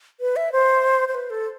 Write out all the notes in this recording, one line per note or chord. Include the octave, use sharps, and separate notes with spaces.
B4
E5
C5
C5
B4
A4